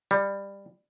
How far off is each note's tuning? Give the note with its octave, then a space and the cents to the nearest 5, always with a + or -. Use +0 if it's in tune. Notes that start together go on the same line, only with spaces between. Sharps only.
G3 +15